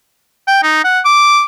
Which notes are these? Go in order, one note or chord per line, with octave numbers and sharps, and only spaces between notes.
G5
D#4
F#5
D6